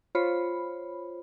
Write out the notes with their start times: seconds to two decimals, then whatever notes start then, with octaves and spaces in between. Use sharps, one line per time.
0.15 F4 C5 C#5 B5